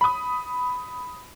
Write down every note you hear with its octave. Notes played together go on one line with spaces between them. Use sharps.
B5 D#6